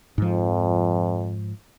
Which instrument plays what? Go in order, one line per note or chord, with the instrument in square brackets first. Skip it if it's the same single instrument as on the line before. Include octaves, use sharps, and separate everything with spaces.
[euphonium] F2 [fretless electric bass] G#2 F3